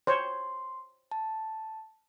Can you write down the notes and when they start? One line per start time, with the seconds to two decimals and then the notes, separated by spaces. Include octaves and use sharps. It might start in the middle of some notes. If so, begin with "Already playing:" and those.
0.07 C5 C#5 C6
1.11 A5